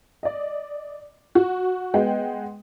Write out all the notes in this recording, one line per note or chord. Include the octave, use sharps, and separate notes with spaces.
D5 D#5
F#4
G#3 B3 F#5 G5